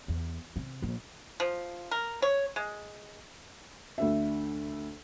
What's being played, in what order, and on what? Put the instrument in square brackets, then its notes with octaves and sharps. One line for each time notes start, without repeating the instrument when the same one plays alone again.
[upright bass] E2
C3
A#1
[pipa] F3
A#4
C#5
G#3
[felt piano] D2 D3 E5